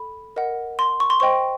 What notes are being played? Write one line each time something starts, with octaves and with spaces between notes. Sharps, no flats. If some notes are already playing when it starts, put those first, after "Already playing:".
Already playing: A4 B5
A#4 D#5 F#5
C6
C#6
C6
C5 D#5 G5 C#6